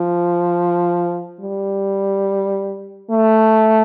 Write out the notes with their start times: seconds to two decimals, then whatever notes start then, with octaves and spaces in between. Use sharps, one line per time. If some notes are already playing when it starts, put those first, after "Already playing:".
Already playing: F3
1.41 G3
3.11 A3